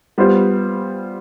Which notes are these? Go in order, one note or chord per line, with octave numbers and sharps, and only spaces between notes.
G3 B3 F4 C5